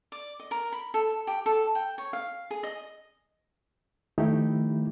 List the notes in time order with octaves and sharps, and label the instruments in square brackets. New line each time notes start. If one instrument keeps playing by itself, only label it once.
[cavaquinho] D5
D#5
A#4
B5
A4
G4
A4
G5
C#5
F5
G#4
D#5
[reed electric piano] D#3 F3 A3 D#4 E4 G4